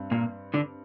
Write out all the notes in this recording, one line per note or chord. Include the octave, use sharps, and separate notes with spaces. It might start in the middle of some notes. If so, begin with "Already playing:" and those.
Already playing: G2 C4
A#2 A#3
D3 D4